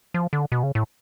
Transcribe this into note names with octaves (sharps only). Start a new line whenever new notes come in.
F3
D3
B2
C#3
A2